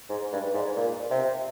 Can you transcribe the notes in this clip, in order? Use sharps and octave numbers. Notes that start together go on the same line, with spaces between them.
G#2
G2
G#2
A#2
C3